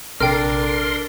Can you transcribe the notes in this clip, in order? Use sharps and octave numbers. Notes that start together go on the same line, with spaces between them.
A#1 C3 D4 A4 A#4 G5 C6 F6